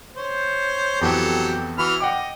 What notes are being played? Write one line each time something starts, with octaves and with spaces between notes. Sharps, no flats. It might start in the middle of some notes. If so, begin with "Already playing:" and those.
C5 C#5
F2 E3 F#3 B3 G4 A4
E3 F#4 B5 F6
D#5 F#5 G5 D6